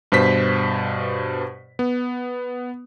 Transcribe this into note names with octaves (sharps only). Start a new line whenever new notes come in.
G2 B2 C5 B6
B3